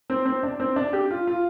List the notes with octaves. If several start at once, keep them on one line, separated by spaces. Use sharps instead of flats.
C4
C4
D4
C4
D4
G4
F4
F4